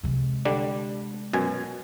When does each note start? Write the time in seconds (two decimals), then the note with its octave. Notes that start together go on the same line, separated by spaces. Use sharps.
0.03 C3 G#3
0.45 D3 G3 D4
1.33 F#2 B2 G#5